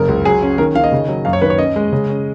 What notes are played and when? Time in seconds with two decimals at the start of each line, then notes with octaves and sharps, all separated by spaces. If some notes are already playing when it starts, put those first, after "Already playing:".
Already playing: F#1 C#3 A#4
0.08 C#2
0.25 F#3 G#4
0.42 C#4
0.58 D#3 A#4
0.75 D#3 F5
0.84 D#5
0.92 C#3
1.09 F#3
1.25 F#2 F5
1.33 C#5
1.41 D#3 B4
1.50 C#5
1.58 C#4 D#5
1.76 G#3
1.92 C#3
2.09 C#4